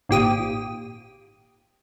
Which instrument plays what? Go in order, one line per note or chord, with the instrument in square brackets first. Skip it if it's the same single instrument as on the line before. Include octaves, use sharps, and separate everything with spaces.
[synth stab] G#1 A#2 G4 D#6